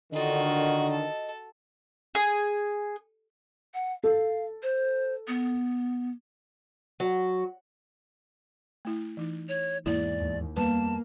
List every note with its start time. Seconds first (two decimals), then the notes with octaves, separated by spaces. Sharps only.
0.13 D3 D#3 F4 F#4 D#5
0.91 A4
2.15 G#4
3.74 F#5
4.04 A4 F5
4.63 C5
5.28 B3
7.00 F#3
8.85 A3 E4
9.17 E3 D#4
9.49 C#5
9.86 E2 G#2 E3 A#3 E4 D5
10.18 D#2
10.57 F2 G3 A#3 B3 B4 A5